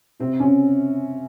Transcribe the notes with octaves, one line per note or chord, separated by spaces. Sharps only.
C3 C4
C#3 C#4